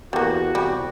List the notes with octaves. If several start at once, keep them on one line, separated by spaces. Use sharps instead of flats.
E2 G3 A#3 F#4
C2 G3